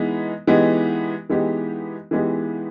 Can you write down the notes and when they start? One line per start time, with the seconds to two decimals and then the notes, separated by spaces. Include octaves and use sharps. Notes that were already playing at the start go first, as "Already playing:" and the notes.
Already playing: E3 G#3 B3 D#4
0.47 E3 G#3 B3 D#4 G4
1.30 E3 G#3 B3 D#4 G4
2.11 E3 G#3 B3 D#4 G4